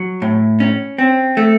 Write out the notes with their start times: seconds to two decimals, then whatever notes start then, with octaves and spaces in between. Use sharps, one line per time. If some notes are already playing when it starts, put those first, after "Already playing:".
Already playing: F#3
0.22 A2
0.60 C#4
0.98 C4
1.37 A3